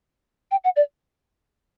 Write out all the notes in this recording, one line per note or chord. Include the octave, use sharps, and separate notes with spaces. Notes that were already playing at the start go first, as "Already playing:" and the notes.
G5
F#5
D5